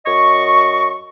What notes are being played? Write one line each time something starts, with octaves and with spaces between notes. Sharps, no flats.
F#2 D#5 C#6